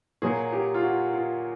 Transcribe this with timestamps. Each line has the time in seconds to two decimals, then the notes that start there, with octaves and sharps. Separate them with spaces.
0.22 A#2 F#3 A#3 G#4
0.53 G4
0.74 F4
0.83 F#4
1.13 F4